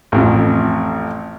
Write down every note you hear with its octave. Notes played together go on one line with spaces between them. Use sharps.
A1 F2